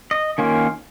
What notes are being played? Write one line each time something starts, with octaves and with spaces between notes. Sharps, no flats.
D#5
D#3 A#3 C#4 F4